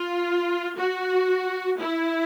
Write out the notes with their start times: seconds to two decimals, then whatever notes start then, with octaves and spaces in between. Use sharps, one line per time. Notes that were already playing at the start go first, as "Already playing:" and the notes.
Already playing: F4
0.77 F#4
1.78 E4